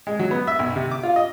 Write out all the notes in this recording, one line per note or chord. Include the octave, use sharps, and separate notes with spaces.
G#3
F#3
B3
E5
B1
C3
D6
F4
D#5